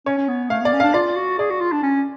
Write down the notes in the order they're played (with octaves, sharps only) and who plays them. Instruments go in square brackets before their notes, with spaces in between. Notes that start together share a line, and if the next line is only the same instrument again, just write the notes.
[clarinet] C#4 [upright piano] C#5
[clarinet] C#4
B3
[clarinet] A3 [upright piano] F5
[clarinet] B3 [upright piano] D5
[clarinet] C#4
[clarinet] D4 [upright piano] F5
[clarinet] F4 [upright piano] D5
[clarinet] F#4
[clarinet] G#4 [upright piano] D5
[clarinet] F#4
F4
D4
C#4